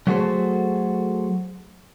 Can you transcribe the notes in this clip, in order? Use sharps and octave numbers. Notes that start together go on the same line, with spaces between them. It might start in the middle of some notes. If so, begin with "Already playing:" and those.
F#3 A3 F#4 G#4 A4 C5